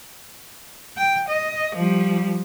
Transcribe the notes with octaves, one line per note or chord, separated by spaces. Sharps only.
G5
D#5
F3 G3